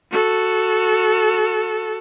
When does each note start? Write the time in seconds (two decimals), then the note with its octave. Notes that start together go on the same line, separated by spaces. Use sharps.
0.11 F#4 A4